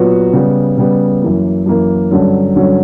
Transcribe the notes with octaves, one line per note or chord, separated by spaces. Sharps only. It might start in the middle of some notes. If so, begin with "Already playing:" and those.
Already playing: A#2 F#3 B3 F#4
C#3 G3 B3
C#3 G3 B3
F#2 E3 A#3
F#2 E3 A#3
G2 D3 F#3 C#4
G2 D3 F#3 C#4